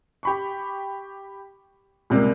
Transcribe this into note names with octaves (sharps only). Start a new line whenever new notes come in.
G4 B5 C#6
C#2 C3 G3 A#3